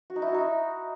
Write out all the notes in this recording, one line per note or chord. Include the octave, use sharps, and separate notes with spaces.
F#4
D#4
E4
F#4
D#4